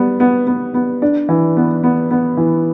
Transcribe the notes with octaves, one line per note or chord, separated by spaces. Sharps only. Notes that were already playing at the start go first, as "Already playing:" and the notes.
Already playing: G3 B3
B3
B3
B3
D4
E3
B3
B3
B3
E3